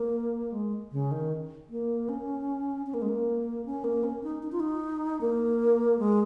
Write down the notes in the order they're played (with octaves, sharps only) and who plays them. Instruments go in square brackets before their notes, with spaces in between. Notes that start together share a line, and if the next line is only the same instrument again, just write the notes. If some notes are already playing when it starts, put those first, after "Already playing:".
Already playing: [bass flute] A#3
G#3
C#3
D#3
A#3
C#4
C#4
A#3
G#3
A#3
C#4
A#3
C#4
D#4
D#4
F4
D#4
A#3
G#3